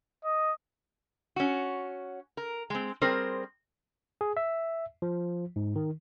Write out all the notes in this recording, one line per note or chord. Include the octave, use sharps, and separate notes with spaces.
D#5
C#4 F#4
A#4
G#3 C4
G3 C4 G#4 A#4 C5
G#4
E5
F3
G#2
D#3